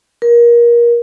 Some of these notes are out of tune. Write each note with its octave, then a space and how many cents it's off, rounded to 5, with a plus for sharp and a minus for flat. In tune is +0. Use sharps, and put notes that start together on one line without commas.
A#4 +25